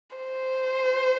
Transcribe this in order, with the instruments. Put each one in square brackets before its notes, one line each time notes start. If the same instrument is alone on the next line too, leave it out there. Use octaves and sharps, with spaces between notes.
[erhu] C5